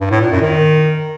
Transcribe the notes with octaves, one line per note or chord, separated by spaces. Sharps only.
G2
A2
A#2
F#2
D#3